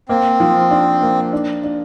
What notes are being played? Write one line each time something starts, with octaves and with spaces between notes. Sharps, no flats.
A#3 C4
F3
D4
A#3
D4
D4